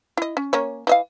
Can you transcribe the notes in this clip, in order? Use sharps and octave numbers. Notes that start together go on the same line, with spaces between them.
E4 D#5
C#4
A#3 C#4 C#5
E3 D#5 F5